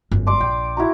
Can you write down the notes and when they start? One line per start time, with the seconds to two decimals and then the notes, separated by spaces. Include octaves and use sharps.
0.11 G1 F#2
0.27 D5 C6 D6
0.40 A#1 G5
0.77 E4 F#4 A#5